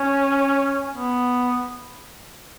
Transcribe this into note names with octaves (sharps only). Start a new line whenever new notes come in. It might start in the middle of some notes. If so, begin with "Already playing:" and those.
Already playing: C#4
B3